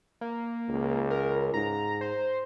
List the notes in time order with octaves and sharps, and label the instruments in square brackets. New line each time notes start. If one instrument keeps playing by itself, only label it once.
[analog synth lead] A#3
[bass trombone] C#2
[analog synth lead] A#4
[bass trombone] G#2 [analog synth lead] A#5
[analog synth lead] C5